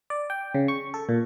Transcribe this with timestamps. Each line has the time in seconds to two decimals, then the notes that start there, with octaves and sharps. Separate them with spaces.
0.10 D5
0.30 G5
0.54 C#3
0.68 C#6
0.94 A4
1.09 A#2